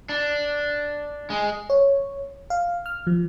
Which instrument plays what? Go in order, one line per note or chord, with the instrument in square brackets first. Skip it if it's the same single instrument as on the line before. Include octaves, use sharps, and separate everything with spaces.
[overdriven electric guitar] D4
G#3
[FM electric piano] C#5
F5
F6
F3